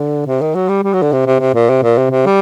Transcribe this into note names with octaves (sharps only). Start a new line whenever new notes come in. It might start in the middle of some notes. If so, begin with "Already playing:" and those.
Already playing: D3
C3
D#3
F#3
G3
G3
F#3
D3
C3
C3
C3
A#2
C3
A#2
C3
C3
G3